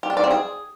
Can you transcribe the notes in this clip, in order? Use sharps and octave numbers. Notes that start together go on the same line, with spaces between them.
G4
D4
D5
C4
G#4